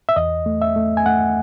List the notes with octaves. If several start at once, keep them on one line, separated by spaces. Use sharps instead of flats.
E5
E2 D#5
A3
E5
A3
G#5
A3 F#5